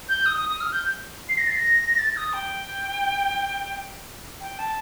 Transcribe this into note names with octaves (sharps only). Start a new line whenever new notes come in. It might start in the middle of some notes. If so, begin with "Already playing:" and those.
G6
D#6
D#6
D#6
F6
G6
C7
A#6
A6
C7
A#6
A6
D#6
G5
G5
A5